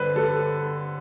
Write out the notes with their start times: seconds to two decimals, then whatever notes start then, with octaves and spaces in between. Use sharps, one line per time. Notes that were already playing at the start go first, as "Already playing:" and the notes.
Already playing: G2 D3 B4 C5
0.16 G3 A4